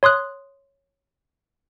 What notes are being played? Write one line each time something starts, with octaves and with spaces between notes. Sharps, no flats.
C#5 C6 D#6 F#6